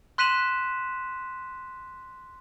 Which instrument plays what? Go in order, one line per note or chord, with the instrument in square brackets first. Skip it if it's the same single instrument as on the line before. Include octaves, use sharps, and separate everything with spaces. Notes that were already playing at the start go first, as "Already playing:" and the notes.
[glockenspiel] C6 F#6 B6 D#7 E7 F#7